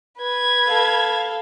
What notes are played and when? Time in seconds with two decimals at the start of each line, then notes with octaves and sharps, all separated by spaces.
0.18 B4 G#6
0.66 A4 F5